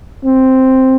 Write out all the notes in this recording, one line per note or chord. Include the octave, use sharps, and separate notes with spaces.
C4